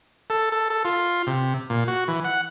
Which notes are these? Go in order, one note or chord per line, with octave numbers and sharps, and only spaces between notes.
A4
A4
A4
F4
C3
A#2
F#4
E3
F#5